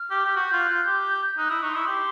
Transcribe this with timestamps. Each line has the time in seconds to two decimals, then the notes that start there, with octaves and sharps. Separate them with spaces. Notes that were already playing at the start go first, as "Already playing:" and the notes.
Already playing: F6
0.10 G4
0.25 G4
0.36 F#4 G6
0.48 F4 G6
0.61 F#6
0.69 F4 G6
0.86 G4
1.37 D#4 F#6
1.50 E4 D#6
1.62 D#4 C#6
1.70 C6
1.75 E4 C#6
1.87 G4 C6